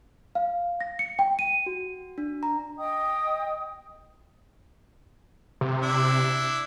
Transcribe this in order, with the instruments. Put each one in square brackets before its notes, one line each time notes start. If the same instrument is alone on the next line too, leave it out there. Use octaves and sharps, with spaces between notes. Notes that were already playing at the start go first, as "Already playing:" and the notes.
[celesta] F5
A#6
C#7
G5
D#7
[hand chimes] F#4
D4
A#5
[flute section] D#5 G5 D#6
[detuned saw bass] C3
[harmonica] D4 E4